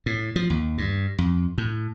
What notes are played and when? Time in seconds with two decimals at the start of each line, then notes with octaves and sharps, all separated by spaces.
0.06 A2
0.36 F3
0.50 D#2
0.78 G2
1.18 F2
1.58 A2